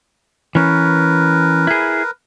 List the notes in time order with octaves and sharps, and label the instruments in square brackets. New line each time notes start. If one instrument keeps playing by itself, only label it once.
[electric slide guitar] E3 C#4 [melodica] A#4 B4
[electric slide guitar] E4 G#4